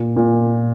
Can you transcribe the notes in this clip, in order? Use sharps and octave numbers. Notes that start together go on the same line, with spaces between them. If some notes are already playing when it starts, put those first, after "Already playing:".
Already playing: A#2
A#2